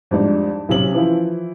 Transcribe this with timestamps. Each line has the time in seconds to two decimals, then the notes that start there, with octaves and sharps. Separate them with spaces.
0.11 F2 G#2 G3 D4 D#4
0.69 B1 C3 C#4 F#7
0.94 E3 F3 E4